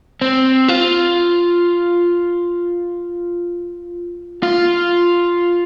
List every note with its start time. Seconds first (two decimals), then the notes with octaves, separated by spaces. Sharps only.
0.21 C4
0.68 F4
4.43 F4